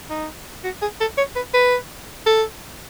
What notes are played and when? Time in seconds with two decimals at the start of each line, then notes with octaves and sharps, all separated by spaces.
0.10 D#4
0.64 F#4
0.82 G#4
1.00 A4
1.17 C#5
1.36 B4
1.54 B4
2.26 A4